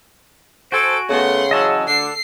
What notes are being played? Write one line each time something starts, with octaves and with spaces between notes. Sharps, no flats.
F#4 A4 C5 G#5 D7
C#3 A3 B3 F#5 C6
E3 F#3 C#4 D#5 A5 E6
D2 D3 D4 A4 C7